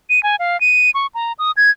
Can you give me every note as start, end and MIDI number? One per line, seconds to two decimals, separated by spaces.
0.10 0.22 99
0.23 0.36 80
0.39 0.59 77
0.61 0.91 99
0.94 1.07 85
1.15 1.33 82
1.39 1.51 87
1.57 1.71 92